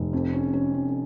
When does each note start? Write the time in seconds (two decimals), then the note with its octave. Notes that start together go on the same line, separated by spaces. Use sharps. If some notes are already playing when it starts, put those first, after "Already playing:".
Already playing: F1
0.13 F2
0.33 C#4
0.53 C#4
0.74 F2